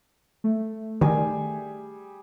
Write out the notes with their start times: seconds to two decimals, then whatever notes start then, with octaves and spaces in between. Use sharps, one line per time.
0.44 A3
1.01 D#3 G3 G#4 G#5